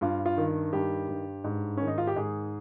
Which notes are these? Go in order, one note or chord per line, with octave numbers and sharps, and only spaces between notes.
G2 F4
F4
D#3
G2 G4
G2
G#2
D#3 C#4
D#4
F4
G4
G#2 G#4